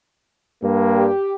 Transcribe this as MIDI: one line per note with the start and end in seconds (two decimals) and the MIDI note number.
0.63 1.09 43
0.63 1.09 55
0.63 1.09 58
0.97 1.35 67